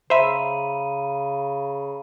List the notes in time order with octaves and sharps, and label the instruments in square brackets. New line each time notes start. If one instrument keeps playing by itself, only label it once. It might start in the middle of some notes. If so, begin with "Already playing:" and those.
[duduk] C#3 [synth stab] C5 E5 [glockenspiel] A#5 B5 D#7